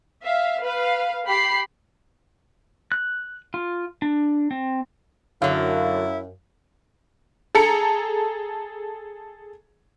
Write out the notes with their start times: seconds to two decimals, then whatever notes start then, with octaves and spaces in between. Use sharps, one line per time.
0.22 E5 F5
0.62 B4 F5
1.25 G4 B5 C7
2.92 F#6
3.54 F4
4.02 D4
4.51 C4
5.42 F#2 D3 F#3 E4 F5
7.55 G#4 A4 A#5 C#7